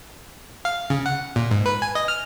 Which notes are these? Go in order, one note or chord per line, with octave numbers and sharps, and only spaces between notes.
F5
C#3
F#5
A#2
G#2
B4
G#5
D#5
F6